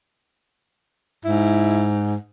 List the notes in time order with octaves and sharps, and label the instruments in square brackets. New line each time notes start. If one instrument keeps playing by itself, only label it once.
[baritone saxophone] G#2 [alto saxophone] E4